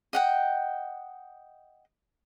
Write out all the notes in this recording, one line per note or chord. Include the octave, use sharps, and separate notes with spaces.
D#5 F#5 G5